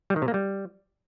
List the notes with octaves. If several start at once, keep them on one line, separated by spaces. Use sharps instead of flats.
G3
D#3
C3
A#3
G3